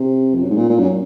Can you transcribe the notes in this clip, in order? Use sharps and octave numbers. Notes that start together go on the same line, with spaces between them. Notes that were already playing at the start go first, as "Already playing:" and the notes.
Already playing: C3
F2
F#2
G#2
A#2
A#2
F#2